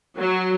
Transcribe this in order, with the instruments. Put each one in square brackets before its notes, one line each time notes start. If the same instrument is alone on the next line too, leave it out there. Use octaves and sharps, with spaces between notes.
[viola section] F#3